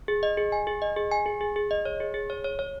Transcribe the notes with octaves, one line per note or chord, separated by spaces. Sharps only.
G#4
D#5
G#4
G#5
G#4
D#5
G#4
G#5
G#4
G#4
G#4
D#5
C#5
G#4
G#4
C#5
C#5
C#5